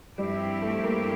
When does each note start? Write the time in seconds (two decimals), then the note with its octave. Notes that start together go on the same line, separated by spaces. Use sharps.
0.17 G2 F3 G3 C4 E4 G4
0.62 A3
0.84 A#3